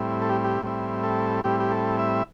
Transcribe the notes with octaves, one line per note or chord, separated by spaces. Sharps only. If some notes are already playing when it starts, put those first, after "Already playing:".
Already playing: A2 G3 C4 E4
A4
G4
G4
A2 G3 C4 E4
A4
A2 G3 C4 E4 G4
G4
A4
E5